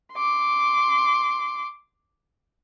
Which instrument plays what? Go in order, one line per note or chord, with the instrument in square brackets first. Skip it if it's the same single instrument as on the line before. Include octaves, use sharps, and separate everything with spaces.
[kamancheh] C6 D6